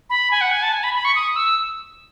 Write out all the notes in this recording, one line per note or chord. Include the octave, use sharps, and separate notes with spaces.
B5
G#5
F#5
G#5
A5
G#5
B5
B5
C#6
D#6
E6